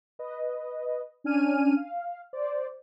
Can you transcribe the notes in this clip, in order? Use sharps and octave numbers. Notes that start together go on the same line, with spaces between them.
B4 D#5
C#4 D4 G#5 F6 D#7
F5
C5 D5